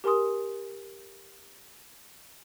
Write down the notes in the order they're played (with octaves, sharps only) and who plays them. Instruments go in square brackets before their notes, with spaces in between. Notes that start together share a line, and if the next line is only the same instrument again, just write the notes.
[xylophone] G4 A#4 G#5 C6 D#6